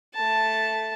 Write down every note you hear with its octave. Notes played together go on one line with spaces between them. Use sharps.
A3 A5